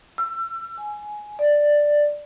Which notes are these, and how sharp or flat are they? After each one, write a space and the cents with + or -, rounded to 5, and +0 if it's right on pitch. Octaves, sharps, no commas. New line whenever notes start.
E6 +35
G#5 +10
D5 +5